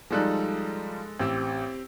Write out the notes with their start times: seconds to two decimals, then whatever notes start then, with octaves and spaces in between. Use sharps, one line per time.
0.11 F3 G3 G#3 D#4 A4 F#6
1.19 A1 C4 G4 E6